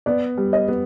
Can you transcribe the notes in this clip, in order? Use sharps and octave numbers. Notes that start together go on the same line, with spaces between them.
B3 D5
G3
D#5
B3